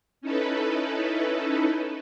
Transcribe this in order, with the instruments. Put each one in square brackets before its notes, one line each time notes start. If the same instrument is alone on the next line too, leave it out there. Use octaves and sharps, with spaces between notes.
[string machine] C#4 D#4 E4 A4 B4